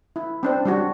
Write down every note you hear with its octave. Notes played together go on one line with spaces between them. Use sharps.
E4
C4 D4 C5
G3 D4 F#4